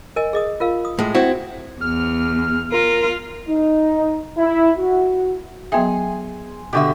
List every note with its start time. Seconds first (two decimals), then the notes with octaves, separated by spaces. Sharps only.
0.16 A#4 D#5 G#5
0.33 G#4 D#5 D#6
0.60 F4 A#4 F5
0.85 D#6
0.99 A2 G#3
1.14 C4 E4 F#4
1.81 E2 F6
2.72 F4 A#4
3.47 D#4
4.37 E4
4.76 F#4
5.72 F#3 B3 G#4 E5 G#5 C6
6.73 B2 D3 F#4 G4 E5